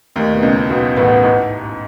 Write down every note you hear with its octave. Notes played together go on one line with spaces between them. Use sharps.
D#2 D#3 A3
B2
C#2 C#3 C#4 E4
B1 B2 F#4
A1 A2 B4 F#5
G#2 E4